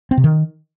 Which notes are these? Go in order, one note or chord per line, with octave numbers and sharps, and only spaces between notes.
C4
C3
D#3